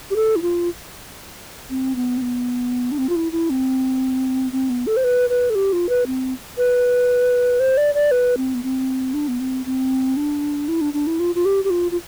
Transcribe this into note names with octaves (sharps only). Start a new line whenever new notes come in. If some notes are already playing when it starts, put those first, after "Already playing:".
G4
A4
E4
F4
C4
B3
C4
B3
D4
C4
F4
E4
E4
C4
C4
B3
A4
C5
B4
B4
A4
G4
F4
B4
C4
B4
C5
D5
D5
B4
C4
B3
C4
D4
B3
C4
C4
D4
E4
D4
D4
E4
F4
F4
G4
G4
F4
F4